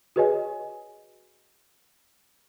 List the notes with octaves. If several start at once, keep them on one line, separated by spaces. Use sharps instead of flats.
F#4 G#4 B4 C#5 D#5 G#5